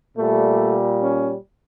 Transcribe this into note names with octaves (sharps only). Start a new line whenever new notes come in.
A#2 G3 A3
C#4